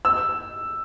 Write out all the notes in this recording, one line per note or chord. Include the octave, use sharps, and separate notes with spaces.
E6